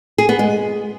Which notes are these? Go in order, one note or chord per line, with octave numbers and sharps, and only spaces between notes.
G#4
B3
G#3